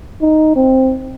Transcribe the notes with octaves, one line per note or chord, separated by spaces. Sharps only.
D#4
C4